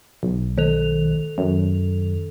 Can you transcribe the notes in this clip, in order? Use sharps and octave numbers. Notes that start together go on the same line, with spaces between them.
B1
D#3 A4 F7
F#2